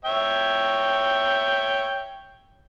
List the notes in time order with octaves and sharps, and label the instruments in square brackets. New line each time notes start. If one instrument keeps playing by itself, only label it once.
[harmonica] C#5 E5 G5